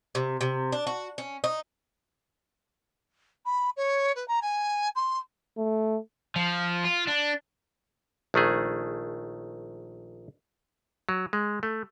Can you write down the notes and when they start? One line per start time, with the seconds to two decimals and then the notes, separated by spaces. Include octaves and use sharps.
0.15 C3
0.41 C3
0.72 D4
0.87 F#4
1.18 C#4
1.44 D#4
3.45 B5
3.76 C#5
4.15 B4
4.28 A#5
4.42 G#5
4.95 C6
5.57 A3
6.36 F3
6.84 F4
7.07 D4
8.34 A#1 D#3 A3 G#4
11.09 F#3
11.33 G#3
11.63 A3